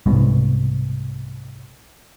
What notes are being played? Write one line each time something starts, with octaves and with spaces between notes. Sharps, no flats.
C2 G#2 B2